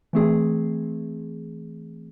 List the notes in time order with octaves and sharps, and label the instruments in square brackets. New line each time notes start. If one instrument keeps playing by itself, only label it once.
[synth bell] E3 A3 C4 G#4